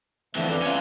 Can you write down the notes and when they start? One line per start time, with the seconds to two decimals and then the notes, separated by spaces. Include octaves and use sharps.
0.35 F2 D3 E3 F3 A3
0.49 B4 D5
0.62 C#4 F4